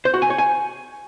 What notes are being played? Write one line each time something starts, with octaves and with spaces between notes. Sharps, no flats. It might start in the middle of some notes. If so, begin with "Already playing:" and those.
C5
F#4
G#5
C#5
G#5